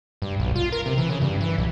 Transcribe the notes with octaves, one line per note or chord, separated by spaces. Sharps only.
G2
B1
F4
A#4
C3
E3
C#3
G2
E3
B1